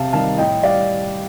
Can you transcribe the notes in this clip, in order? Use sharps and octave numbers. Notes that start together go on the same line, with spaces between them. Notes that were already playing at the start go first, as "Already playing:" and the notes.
Already playing: C3 F5 A5
D#3 G3 F5 A5
A2 D#5 G5
G3 D5 F5